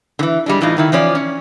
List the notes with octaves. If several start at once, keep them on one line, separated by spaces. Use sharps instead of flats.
D3 E3
G3 G#3 D4
A2 E3 D#4 F4
D3 D#3 E4
E3 F3 C#4 D5
C#4